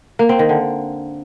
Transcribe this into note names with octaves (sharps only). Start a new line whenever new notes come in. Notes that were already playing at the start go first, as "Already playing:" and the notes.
A#3
C4
D#3
D3